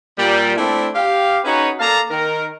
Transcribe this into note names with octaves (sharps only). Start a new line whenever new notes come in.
A#2 G3
A3 C4 D4 E4
G4 F5
C#4 D#4 F#4 G#4 B4 C#5
A#3 A4 D5 F5 A5 A#5
D#3 A#4